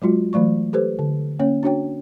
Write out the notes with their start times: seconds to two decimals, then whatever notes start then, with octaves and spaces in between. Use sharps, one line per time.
0.02 F#3 G#3 F4 F#4
0.33 E3 F#3 A3 D5 C#6
0.73 G4 A4 B4 C5
0.99 D3
1.39 A#3 C#4 C#5
1.63 D4 F#4 C#5 G5